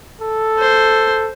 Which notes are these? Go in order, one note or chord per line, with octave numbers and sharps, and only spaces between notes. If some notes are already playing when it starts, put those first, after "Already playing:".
A4
C5